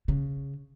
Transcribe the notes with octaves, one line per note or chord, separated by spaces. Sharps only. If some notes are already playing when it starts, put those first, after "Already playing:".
C#3